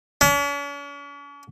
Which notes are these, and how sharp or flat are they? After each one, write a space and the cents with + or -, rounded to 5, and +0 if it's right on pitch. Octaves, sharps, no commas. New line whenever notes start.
C#4 +45